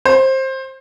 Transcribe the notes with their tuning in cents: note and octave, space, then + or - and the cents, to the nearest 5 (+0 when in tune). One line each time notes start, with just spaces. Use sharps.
C5 +20